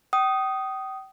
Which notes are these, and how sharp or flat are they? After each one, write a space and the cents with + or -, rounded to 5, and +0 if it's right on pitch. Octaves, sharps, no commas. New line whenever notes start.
G5 -35 D#6 +0